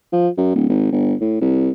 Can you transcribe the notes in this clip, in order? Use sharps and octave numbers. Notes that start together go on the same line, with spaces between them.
F3
F#2
D1
G#1
G1
A2
C2